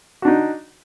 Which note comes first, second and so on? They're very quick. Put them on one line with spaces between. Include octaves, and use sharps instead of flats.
F#4 D4 D#4